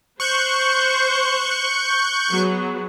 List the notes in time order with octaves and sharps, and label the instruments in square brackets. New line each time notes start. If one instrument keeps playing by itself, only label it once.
[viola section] C5 [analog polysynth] C#6 F#6 G6
[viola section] F#3 B3 G#4